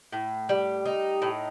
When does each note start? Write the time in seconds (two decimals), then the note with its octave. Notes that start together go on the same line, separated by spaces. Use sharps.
0.12 A2
0.49 G3
0.85 D#4
1.22 A2